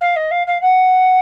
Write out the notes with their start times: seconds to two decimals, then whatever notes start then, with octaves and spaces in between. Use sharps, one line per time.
0.01 F5
0.16 D#5
0.31 F5
0.47 F5
0.61 F#5